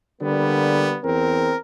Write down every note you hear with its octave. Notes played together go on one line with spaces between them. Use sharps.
D3 G3 A#3 B3
E2 C4 A#4